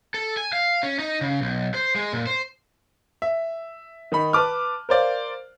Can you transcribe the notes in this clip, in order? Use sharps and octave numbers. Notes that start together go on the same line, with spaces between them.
A4
G#5
F5
C#4
D#4
C#3
B1
C5
G#3
A#2
C5
E5
D#3 D#4 B5
B4 A5 D6 F6
A#4 C5 D5 F5